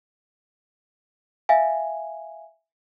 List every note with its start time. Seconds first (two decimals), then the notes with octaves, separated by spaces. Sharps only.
1.49 E5 F5 G#5